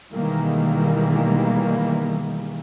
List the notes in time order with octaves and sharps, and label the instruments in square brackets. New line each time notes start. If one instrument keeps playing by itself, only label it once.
[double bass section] B2 D#3 E3 G3 G#3 A#3